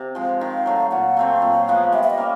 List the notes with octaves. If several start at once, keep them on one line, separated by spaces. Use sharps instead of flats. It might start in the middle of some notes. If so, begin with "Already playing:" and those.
Already playing: C3
F3 G#3
D#3 F5
F#3 A3
A#2 F#5
F#3 A3 C4 F5
A#2
F3 G#3 B3
G3 E5
E5
D#5
A#3 C#4